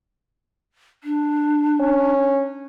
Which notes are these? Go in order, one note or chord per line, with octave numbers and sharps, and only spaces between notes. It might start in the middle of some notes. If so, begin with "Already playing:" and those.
D4
C#4